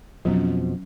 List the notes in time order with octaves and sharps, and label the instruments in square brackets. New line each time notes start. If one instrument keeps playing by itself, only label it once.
[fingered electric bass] F2 B2 F3 [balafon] F#3 C#4